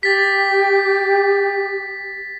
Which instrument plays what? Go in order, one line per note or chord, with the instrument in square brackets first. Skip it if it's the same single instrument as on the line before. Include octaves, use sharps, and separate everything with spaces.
[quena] G4 [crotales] A6 B6